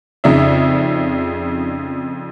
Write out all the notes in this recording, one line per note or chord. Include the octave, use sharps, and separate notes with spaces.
F2 C#3 D#4 D5 E5